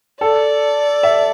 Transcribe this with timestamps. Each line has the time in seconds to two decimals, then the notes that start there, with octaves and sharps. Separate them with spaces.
0.21 A4 D5
1.03 E5